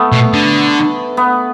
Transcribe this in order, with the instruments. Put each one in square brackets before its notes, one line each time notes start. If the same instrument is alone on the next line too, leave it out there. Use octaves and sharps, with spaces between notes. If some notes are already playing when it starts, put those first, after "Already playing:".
Already playing: [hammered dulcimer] A3 B3
[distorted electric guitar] B2
D3
[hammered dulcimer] B3